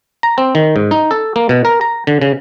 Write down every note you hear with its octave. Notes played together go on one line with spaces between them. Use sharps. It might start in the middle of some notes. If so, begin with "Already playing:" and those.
A#5
C4
D#3
G#2
D#4
A4
A#3
B2
A#4
A#5
D3
C#3